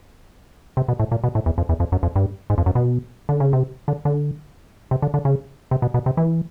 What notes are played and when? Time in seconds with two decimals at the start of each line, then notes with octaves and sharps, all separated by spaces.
0.77 C3
0.88 B2
1.00 A2
1.12 A#2
1.24 B2
1.35 A2
1.46 E2
1.58 F2
1.69 E2
1.80 F2
1.92 F#2
2.03 F2
2.16 G2
2.50 G#2
2.58 F2
2.66 F#2
2.75 B2
3.29 D3
3.40 C#3
3.53 C3
3.88 D3
4.05 D3
4.91 C3
5.02 D3
5.14 D3
5.25 C#3
5.71 C3
5.82 B2
5.94 B2
6.06 C3
6.17 E3